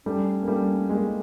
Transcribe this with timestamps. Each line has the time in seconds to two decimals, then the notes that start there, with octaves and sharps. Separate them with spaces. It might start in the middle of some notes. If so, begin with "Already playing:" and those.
0.06 G3 A3 C#4
0.43 A#3
0.48 G3 A3
0.89 G#3 A#3